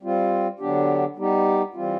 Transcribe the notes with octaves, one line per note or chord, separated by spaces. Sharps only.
G3 C4 F4
D3 F#3 B3 D4 G4
G3 B3 D#4 G4
E3 G3 C4 F4